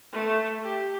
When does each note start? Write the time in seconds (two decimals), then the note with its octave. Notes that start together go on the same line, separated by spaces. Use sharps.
0.12 A3
0.63 G4